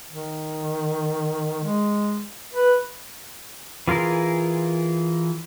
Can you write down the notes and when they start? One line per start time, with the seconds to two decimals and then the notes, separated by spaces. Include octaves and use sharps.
0.11 D#3
1.64 G#3
2.55 B4
3.88 E3 F4 G#4 A#4